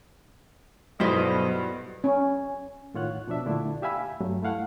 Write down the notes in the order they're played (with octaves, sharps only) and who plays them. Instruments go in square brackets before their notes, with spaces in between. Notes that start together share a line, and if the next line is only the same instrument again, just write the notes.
[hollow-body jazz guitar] B1 E4 C5 [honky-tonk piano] G2 [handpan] B3 F#4 [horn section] A4 D#5
[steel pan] C#4
[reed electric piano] A2 D#3 F4 C#5 F#5 F#6
B2 F3 D4 E5
A#2 D3 A3 D4 E4 F4
G4 E5 F5 G#5 B5 E6
G2 F#3 G3 A3
A3 E4 F5 F#5